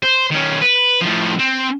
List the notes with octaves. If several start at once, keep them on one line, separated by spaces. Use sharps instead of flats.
C5
D#3 C#4
B4
A2 F3
C4